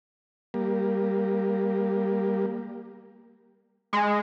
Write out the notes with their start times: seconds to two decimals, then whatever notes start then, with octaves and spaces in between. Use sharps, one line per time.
0.54 G3 A#3
3.93 G#3